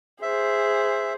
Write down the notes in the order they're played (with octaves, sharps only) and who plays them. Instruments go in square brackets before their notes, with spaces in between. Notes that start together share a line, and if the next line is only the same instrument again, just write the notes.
[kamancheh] G#4 C5 [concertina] E5